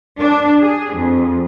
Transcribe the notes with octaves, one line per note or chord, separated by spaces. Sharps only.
D4
G#4
F2